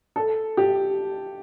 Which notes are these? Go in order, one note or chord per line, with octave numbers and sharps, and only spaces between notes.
A4
G4